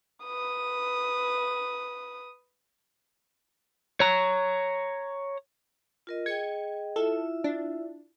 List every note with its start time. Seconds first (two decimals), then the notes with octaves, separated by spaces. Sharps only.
0.24 B4 D#6
4.00 C#5 A#5
6.07 F4 A#4 D#5
6.26 G#4 D#5 G5 G#6 C#7
6.96 E4 F4 A4 E5
7.44 D4